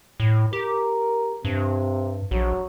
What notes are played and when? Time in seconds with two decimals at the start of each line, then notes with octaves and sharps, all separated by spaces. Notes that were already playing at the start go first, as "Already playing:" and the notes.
0.20 A2
0.53 G4 A#4
1.45 G2 C3
2.31 A#1 F#3